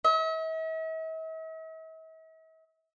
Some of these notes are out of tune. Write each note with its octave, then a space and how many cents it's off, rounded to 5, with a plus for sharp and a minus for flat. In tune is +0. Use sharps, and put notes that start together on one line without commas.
E5 -45